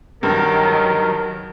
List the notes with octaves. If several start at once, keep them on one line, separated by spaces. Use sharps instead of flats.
C#2 G2 D#3 F#3 A#4